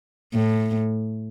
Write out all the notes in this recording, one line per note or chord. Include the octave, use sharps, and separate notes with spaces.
A2